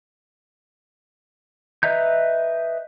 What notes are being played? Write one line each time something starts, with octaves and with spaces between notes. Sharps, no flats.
B4 D#5 E5 A#5 G6